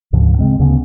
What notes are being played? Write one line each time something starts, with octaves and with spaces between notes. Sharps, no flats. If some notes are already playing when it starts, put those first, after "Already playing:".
D2 G#2 C#3 F3
C#3 G#3 C4
D2 C#3 B3 C#4